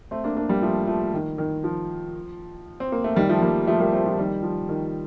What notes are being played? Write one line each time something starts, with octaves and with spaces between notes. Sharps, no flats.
A3 C4
A#3 D4
A#3 D4
G3 A#3
F3 A3
F3 A3
D#3
D#3
F3
C4
A#3
A3
D#3 G3
F3 A3
G3 A#3
F3 A3
G3 A#3
A3 C4
F3
D#3 G3
F3
D#3